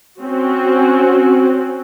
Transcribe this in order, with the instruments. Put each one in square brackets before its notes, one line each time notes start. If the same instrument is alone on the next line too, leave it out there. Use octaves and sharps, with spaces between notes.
[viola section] C4 C#4 F#4